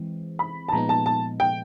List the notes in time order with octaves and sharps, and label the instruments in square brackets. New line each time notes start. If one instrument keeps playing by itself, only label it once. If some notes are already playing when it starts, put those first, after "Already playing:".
Already playing: [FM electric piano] E3 G#3 C4
[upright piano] B5
A5
[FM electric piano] A#2 F3 G#3 B3 D#4 [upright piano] A#5
[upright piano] A5
A5
G5